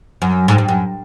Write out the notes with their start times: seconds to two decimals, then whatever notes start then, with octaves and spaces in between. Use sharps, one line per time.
0.22 F#2
0.48 G#2
0.58 G2
0.68 F#2